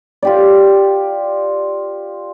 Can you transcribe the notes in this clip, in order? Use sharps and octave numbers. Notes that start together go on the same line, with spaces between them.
F4 G4 D5